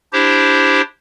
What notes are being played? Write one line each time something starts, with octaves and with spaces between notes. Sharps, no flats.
D4 E4 G4 C5